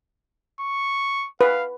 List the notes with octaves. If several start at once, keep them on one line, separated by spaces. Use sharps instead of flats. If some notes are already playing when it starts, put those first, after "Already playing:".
C#6
B4 F5